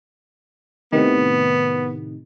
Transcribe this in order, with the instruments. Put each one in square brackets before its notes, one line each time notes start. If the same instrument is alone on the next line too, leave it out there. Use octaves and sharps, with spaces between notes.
[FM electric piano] A2 C3 D#3 [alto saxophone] B3